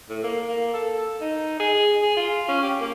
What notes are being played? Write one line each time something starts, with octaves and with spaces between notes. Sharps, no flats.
A2
A#3
A#3
A4
D#4
G#4
G#4
F4
C#4
G4
A#3